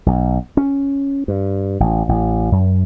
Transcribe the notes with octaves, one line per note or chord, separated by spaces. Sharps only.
B1
C#4
G2
A1
A1
F#2